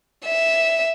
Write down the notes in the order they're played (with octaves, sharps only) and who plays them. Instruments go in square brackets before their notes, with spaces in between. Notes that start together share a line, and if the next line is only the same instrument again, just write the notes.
[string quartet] E5